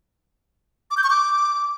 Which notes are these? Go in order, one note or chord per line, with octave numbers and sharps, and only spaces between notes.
D6
G6
C#6
D6